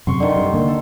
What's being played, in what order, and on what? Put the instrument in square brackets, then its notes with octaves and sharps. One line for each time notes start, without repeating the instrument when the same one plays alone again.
[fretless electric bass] F#2 C3 [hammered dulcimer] C6 C#6
[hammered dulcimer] D3 D#3
[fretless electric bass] G2
D3 A#3
[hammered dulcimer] A4